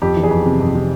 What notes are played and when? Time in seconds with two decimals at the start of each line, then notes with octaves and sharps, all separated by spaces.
0.02 F2 G4
0.16 E3
0.24 G#4
0.31 F2
0.46 C3
0.60 F2
0.75 C3